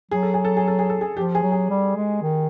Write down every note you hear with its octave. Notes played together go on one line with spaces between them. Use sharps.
F#3 G#4
A4
G#4
A4
G#4
A4
G#4
A4
G#4
F3 G4
G#4
F#3
G#4
G3
G#3
D#3